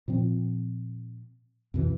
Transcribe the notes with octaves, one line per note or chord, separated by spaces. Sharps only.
A#2 F3 C4
F2 B2 E3